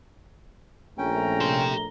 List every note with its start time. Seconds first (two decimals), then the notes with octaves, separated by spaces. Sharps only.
0.98 A#1 A3 C#4 G5 A#5
1.41 G4 C6